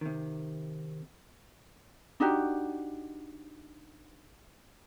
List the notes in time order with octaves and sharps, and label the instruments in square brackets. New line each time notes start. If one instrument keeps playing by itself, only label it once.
[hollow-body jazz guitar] C3 D#3
[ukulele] D4 D#4 F#4 G4